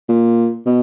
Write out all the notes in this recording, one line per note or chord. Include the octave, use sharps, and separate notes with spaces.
A#2
B2